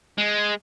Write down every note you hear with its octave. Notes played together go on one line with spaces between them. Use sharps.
G#3